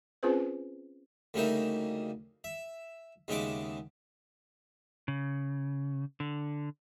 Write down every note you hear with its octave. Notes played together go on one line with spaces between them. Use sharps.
C4 C#4 F4 G#4 B4 C5
D2 C#3 G3 A#3 D#4 E5
E5
D#2 C#3 G#3 B3 E5 D6
C#3
D3